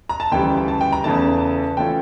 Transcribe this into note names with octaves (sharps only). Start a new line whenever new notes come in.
A#5
A5
D2 C#3 E3 G3 G5
A5
G5
A#5
E2 C#3 E3 A3 A5
E3 A3 C#4 F4 G5